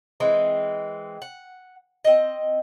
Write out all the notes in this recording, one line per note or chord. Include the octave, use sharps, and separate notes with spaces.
E3 G#3 C4
F#5
C4 D#5